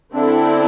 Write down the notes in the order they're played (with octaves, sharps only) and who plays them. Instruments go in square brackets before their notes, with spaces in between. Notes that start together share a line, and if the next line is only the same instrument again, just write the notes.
[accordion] D3 D4 [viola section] C4 E4 A4